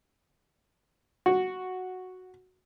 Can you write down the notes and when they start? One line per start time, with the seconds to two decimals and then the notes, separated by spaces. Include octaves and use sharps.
1.26 F#4